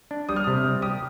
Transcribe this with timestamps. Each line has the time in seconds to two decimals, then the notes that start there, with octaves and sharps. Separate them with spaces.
0.11 D4
0.29 G3 D#6
0.36 F6
0.44 C3 D#6
0.64 G3
0.82 G4 D#6